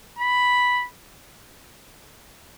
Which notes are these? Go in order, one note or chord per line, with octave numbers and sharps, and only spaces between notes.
B5